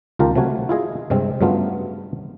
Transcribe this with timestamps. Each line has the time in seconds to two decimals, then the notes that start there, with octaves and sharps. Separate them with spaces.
0.19 C#2 D#3 F4 G4 A#4 A5
0.35 C3 F#3 A3 F#4 G#5
0.69 E4 F4 G#4 D#5
1.10 G2 C3 G#3 C4
1.41 G2 C#3 F#3 A3 B3 F4